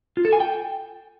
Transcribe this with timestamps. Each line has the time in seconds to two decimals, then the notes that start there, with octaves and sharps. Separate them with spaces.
0.17 F4
0.25 A4
0.33 G#5
0.40 G5